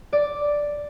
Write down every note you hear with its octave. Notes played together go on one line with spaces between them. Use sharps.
D5